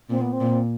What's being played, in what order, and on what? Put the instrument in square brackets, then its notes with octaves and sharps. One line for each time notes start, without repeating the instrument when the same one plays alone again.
[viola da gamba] A#2 [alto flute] C4
[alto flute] B3
C4
[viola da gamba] A#2